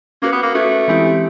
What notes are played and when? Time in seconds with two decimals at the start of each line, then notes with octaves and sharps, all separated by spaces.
0.22 A#3 C#4 F#4 B4
0.32 B3
0.43 A#3
0.55 A3 C#4 F#4 B4
0.88 E3 G#3 C4 E4 G4